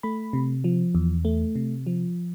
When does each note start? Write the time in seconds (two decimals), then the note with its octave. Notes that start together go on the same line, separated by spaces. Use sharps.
0.03 A3 B5
0.33 C3
0.64 F3
0.95 E2
1.25 A3
1.55 C3
1.86 F3